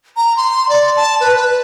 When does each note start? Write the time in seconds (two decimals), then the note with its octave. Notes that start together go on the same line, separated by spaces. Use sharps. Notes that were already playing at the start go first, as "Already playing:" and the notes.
0.17 A#5
0.37 C6
0.69 D5
0.96 A5
1.21 B4
1.36 B4